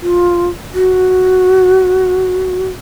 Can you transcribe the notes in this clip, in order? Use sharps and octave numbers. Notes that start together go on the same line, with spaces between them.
F4
F#4